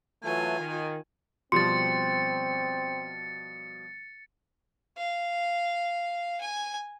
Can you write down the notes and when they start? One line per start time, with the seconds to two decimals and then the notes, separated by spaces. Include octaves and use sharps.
0.23 E3 F#3 A3 F4 G#5
0.59 D#3
1.52 B2 F3 G3 C4 C6 A6 C#7
4.97 F5
6.41 G#5